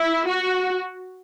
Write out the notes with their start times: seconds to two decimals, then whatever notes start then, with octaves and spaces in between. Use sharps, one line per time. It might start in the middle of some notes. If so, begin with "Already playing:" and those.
Already playing: E4
0.27 F#4